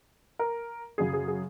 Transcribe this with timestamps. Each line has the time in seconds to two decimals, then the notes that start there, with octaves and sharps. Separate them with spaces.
0.39 A#4
0.98 F#2 C#3 F#3 G#4
1.13 G#4
1.28 G#4